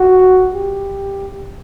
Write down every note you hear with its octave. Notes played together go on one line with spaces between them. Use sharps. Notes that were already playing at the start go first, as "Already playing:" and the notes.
Already playing: F#4
G4